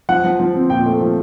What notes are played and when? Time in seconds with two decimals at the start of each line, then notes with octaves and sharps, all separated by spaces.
0.09 F3 F#5
0.25 F3
0.40 F3
0.55 C4
0.70 A#2 G5
0.86 A3
1.01 F3